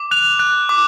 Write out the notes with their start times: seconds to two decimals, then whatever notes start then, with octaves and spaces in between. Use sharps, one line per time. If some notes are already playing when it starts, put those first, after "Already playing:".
Already playing: D6
0.11 F#6 F7
0.39 F#6
0.69 D6